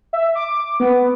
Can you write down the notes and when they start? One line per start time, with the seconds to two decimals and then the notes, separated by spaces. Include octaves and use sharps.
0.13 E5
0.35 D6
0.80 B3